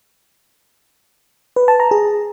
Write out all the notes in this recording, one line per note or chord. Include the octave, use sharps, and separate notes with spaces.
B4
A5
A#5
G#4